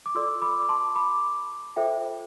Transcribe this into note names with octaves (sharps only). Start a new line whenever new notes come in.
D6
F4 A4 D5 C6 E6
B5 D6
D6
A5 C6
B5 D6
F4 A4 C5 E5 G5